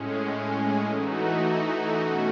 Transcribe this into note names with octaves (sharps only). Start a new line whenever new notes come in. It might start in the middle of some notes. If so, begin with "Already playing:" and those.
Already playing: A2 G#3 C#4
E3 A3 D#4 F#4
B2 A3 C#4 F#4